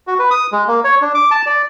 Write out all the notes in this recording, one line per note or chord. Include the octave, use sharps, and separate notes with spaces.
F#4
B4
D#6
G#3
A#3
C#5
D4
D6
A5
D5